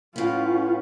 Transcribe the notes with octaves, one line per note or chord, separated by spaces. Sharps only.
A2 B3 C#4 F4